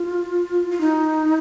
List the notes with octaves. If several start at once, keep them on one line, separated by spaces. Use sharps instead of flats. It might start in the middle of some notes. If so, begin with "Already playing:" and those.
Already playing: F4
F4
D#4